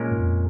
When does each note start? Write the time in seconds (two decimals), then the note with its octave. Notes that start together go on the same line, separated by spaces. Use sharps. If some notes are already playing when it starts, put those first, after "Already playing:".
Already playing: A#2 G#3 C#4 A#4
0.11 G#2
0.19 F2